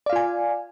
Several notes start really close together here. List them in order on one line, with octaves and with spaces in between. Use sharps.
D5 F5 F4 G#5